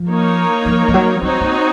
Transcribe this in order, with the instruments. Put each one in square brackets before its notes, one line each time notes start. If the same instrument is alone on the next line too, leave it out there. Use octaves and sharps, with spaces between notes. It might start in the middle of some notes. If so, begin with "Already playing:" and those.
Already playing: [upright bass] F3
[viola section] A#3 D#4 A#4 C#5
[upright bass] F3
F3
F#3
[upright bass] F#3 [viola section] C4 D#4 F#4 C#5
[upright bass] A#3